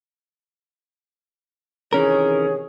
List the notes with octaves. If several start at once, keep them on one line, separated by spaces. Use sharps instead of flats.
C3 D#3 E3 C#4 G#4 A#4 C#5